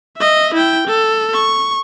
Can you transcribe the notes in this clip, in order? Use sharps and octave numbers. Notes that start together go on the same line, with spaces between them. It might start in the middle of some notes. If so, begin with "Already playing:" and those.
D#5 E5
E4 G5
A4
C#6